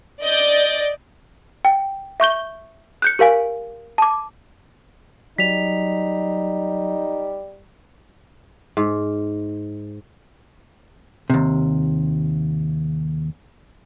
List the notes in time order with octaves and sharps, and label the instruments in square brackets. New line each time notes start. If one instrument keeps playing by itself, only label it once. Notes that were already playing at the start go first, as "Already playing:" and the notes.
[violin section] D5 D#5 G6 A6
[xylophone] G5
E5 C#6 G6 G7
F#6 G6 C#7
G4 A#4 F5 G#5
A5 D6
[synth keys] F#3 [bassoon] G3 [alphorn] D#4 [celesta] B6 F7
[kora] G#2
[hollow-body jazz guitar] D#2 C3